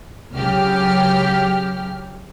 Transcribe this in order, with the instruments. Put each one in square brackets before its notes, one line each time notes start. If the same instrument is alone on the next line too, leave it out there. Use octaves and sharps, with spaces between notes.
[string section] C#2 C#3 F#3 G4 F6